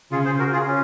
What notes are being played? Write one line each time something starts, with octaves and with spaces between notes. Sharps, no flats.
C#3 F4 G#4
G#4 C5
F#4 A#4
F4 G#4
C#4